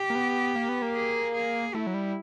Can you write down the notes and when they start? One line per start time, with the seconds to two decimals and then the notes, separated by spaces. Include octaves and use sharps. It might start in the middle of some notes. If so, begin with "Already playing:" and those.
Already playing: G4
0.10 A#3
0.15 B3
0.55 A#3
0.69 B3
0.82 A#3
0.95 G#4
1.34 G#4
1.74 A3 E4
1.87 F#3
1.94 G3